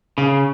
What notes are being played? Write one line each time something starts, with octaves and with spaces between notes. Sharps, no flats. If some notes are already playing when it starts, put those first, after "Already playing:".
C#3